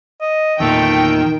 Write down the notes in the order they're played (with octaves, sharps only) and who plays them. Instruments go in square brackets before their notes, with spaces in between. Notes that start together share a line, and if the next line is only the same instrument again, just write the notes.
[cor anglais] D#5
[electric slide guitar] E2 A#2 D#4 [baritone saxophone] D#3 [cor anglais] A3 [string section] G5